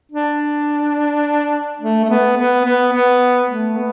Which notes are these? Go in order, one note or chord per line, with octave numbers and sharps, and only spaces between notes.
D4
A3
A3
B3
B3
B3
B3
A3
B3